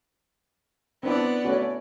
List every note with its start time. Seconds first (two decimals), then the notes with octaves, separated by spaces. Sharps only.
1.03 B3 C4 D4 E4 D5
1.45 A3 C#4 F#4